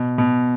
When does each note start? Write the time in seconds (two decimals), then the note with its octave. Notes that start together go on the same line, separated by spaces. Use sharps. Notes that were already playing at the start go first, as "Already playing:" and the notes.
Already playing: B2
0.18 B2